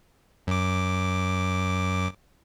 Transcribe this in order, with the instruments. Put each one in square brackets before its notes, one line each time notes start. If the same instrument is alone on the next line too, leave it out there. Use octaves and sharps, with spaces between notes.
[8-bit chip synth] F#2 D6